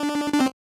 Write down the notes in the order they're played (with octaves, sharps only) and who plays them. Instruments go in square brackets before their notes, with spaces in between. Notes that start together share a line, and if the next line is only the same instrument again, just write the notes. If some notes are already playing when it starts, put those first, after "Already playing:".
Already playing: [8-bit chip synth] D4
D4
C4